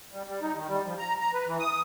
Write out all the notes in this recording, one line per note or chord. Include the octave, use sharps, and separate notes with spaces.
G3
G3
D#4
D#3
G3
F3
A#5
A#5
B4
E3
D#6